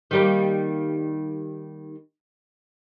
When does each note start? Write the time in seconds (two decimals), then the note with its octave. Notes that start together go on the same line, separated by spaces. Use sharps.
0.11 D#3 G3 A#3